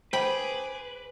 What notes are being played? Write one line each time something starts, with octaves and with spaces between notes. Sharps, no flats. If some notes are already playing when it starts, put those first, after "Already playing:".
G#4 B4 C5 G5 B5 D6